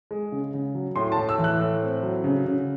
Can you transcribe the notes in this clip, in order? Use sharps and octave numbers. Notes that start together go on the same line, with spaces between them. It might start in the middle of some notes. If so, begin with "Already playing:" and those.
G#3
C#3
C#3
F#3
A2 C6
A5
A2
E6
E3
F#6
A2
C4
F#3
C#3
C#3